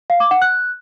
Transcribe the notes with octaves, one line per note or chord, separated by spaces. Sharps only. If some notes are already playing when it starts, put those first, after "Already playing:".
F5
D6
F#5
F#6